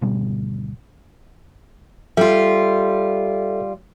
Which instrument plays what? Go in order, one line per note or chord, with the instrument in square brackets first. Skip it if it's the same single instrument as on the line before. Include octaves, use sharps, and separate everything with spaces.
[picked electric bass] G#1 D2 B2 G3
[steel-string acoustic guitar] G3 F4 [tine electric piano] A4 E5